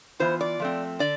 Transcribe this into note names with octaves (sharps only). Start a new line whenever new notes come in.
E3 B3 F4 C5
D5
F3 A3 C4
D3 D5